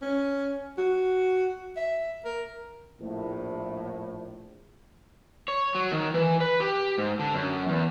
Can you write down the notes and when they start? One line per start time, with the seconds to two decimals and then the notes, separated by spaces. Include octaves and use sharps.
0.02 C#4
0.78 F#4
1.77 E5
2.25 A#4
3.00 A#1 A2
5.48 C#5
5.75 F#3
5.92 D#3
6.14 E3
6.40 B4
6.60 G4
6.98 G#2
7.19 D3
7.34 F#2
7.69 E2